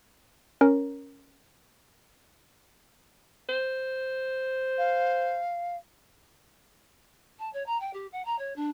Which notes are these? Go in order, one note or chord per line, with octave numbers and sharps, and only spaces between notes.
C#4 A#4
C5
F5
A5
C#5
A#5
G5
G4
F#5
A#5
C#5
D4